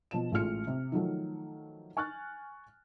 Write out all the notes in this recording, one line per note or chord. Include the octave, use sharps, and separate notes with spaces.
B2 F3 A5 E7
A1 G#3 A3 F4 F6 C#7
C3
D#3 F3 F#3 A3
G#5 C#6 F6 F#6 A6